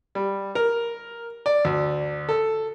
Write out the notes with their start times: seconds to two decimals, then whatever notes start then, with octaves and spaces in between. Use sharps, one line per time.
0.15 G3
0.55 A#4
1.46 D5
1.65 D2
2.29 A4